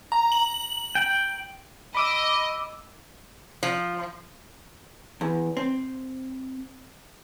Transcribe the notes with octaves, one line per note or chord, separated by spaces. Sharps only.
A#5
F#7
G5
D#5 B5 D6 E6
F3
E2
C4